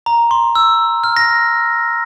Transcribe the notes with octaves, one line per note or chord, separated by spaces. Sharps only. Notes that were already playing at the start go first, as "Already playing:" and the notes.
A#5
C6
E6
F6
A#6